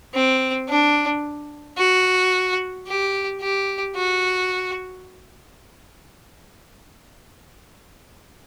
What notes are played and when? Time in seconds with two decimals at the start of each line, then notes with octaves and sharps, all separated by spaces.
0.14 C4
0.69 D4
1.77 F#4
2.87 G4
3.41 G4
3.95 F#4